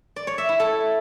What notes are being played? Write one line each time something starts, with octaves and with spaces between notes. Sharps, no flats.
D5
C#5
E5
E4
A4